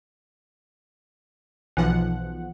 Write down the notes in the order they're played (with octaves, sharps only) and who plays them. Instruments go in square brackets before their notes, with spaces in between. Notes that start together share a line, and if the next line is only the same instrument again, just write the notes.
[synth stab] B1 F3 F#5 [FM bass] E3